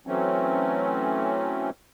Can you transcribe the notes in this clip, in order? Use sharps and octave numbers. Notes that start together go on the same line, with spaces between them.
E3 F#3 A3 C4 C#4